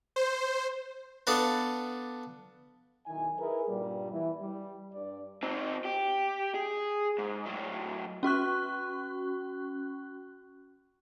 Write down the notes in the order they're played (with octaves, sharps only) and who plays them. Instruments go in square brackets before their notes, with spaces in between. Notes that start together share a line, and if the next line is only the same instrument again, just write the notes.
[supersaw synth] C5
[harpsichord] B3 D4 A4 F5
[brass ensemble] B1 D#3 E4 G#5
D#4 E4 G#4 A#4 B4
G2 A#2 G3
E3
G3
G2 D5
[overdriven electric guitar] C4 D#4
G4
G#4
G#2
A2 F#3
[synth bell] C#4 F#4 C#6 F#6